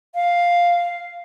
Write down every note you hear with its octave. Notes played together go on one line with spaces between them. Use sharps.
F5